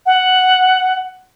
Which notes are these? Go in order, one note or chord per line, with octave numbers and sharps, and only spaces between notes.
F#5